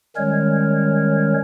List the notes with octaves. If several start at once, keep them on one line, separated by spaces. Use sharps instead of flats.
D#3 G3 G#3 C#4 A#4 C#5